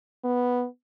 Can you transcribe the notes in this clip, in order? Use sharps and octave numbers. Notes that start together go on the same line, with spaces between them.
B3